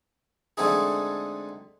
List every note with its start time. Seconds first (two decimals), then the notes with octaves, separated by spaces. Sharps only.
0.57 D3 G#3 A3 C4 D#4 G#4